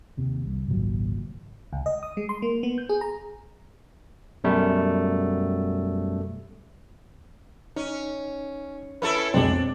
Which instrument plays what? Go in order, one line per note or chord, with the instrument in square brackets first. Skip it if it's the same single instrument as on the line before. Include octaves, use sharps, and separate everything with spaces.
[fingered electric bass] D#2 C3
C2
G#1 C#2 A#2 F#3
[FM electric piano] C#2
D#5
D#6
G#3
C6
A#3
B3
G6
G#4
A#5
[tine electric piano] F#2 B2 G3 A3
[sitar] C#4 [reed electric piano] D#4
[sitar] C#4 E4 A4 [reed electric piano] B4 E5
[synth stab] B1 F2 B2 [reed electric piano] G#3 C4 [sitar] D4